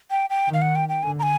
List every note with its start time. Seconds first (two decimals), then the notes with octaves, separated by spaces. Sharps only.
0.11 G5
0.30 G5
0.48 D#3
0.54 F5
0.62 F#5
0.75 G5
0.89 G5
1.03 D3 G#5
1.19 A#5
1.23 G#5